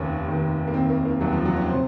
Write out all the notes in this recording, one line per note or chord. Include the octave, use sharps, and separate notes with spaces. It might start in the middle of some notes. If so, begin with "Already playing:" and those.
Already playing: F1 D#2 D#3 C#4
F1 D#2 D#3
A#3
F1 D#2 D#3 C4
A#3
A#3
F1 D#2 D#3 F#3
F3
F#3
C#4
C3 C5